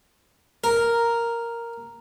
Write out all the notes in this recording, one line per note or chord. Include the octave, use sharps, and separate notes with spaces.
A#4